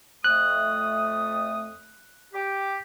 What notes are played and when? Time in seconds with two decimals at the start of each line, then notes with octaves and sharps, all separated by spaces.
0.24 F2 A3 D#6 F#6
2.33 G4